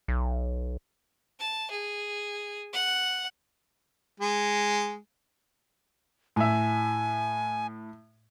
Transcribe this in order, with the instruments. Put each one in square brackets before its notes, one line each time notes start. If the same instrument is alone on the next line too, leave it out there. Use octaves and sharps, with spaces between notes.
[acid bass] B1
[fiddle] A5
G#4
F#5
[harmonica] G#3
[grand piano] A2 E5 [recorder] G#5